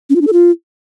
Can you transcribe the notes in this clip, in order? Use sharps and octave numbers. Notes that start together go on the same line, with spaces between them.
C#4
F4
D4
A4
F4